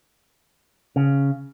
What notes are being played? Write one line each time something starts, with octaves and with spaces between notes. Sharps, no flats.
C#3